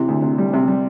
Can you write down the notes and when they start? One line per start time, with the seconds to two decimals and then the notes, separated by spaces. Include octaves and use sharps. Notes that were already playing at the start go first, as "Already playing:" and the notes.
Already playing: C3 E3
0.08 D2
0.22 C3
0.38 G3
0.53 C3
0.68 G3